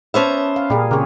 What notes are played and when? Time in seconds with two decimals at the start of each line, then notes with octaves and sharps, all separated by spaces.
0.14 B3 C#4 C5 E5 A5
0.56 F5
0.70 A#2 G3 G#4 A#4
0.91 C#3 A#3 C4 G#4 C#5